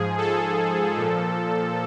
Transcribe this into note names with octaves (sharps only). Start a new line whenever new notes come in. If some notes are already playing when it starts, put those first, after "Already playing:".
Already playing: G#2 F3 G#4
A4
A#2 F3